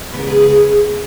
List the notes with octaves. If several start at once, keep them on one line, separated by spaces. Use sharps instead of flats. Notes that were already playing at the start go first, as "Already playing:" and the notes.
C#3 G#3 B3 B4
A#4
G#4 B4